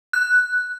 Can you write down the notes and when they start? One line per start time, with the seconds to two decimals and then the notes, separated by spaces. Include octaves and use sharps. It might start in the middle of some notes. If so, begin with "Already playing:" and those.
0.13 F#6